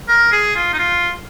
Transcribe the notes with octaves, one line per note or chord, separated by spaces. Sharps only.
A#4
G#4
F4
D#4
F4